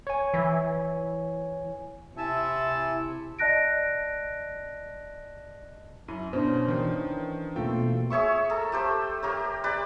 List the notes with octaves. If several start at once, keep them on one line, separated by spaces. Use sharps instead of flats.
C#5 G#5
E3
C3 E4 E5 G#5 A5
D5 D#5 A5 F#6 A#6 D7
F#2 E4 D#7
B2 C#4 D4 C5
D#3 E3
B2 A3 A#3 F4 A4 G5
G#4 C#5 E5 C#6
A4 A#4
A3 G4 C5
G4 A#4 C#5
G4 B4 D5